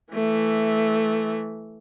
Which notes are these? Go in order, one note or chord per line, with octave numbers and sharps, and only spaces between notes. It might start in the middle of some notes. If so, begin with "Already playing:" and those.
E3 A3